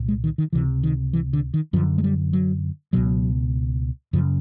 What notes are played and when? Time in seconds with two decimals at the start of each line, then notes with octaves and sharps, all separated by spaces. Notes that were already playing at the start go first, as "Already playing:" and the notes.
Already playing: C2 A#2
0.08 G#3
0.24 D#3
0.38 D#3
0.53 C#2 C3 E3
0.83 D#3
1.13 E3
1.33 D3
1.54 D#3
1.73 F#2 D3 F3
1.98 G#3
2.04 G3
2.33 F#3
2.93 C#2 B2 F#3
4.13 F#2 C#3 F3